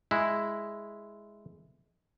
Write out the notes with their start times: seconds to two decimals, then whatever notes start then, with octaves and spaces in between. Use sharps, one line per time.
0.11 G#3 E4